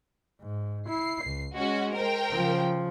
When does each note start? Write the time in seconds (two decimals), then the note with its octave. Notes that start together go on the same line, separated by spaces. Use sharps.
0.41 G#2
0.88 E4 C7
1.24 C#2
1.56 G#3 C#4 F#4
1.94 A#4 C5 G5
2.31 C#3 F3